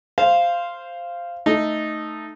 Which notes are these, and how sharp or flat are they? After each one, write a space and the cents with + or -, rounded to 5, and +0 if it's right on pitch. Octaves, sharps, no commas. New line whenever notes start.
C5 +0 F5 -10
A3 +0 D#4 -5